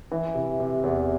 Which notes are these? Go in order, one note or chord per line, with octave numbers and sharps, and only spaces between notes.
E3
C3
C3
E2